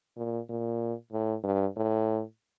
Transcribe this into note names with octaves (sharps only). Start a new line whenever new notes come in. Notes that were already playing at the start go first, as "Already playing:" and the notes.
A#2
A#2
A2
G2
A2